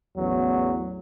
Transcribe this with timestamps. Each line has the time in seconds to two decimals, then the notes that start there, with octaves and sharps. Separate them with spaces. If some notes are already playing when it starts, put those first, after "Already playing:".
0.17 A1 E2 F#3